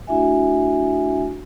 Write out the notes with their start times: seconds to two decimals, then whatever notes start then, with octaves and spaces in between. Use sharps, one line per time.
0.07 A3 D4 E4 F#4 E5 G#5